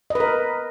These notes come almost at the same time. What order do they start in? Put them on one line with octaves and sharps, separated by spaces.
D#5 B4 A#4